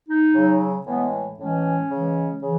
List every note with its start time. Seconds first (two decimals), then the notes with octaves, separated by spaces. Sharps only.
0.08 D#4
0.34 C#3 F#3
0.86 A2 E3 G#3 B3
1.37 A2 E3 G#3 C#4
1.89 C#3 E3 G#3
2.41 C#3 E3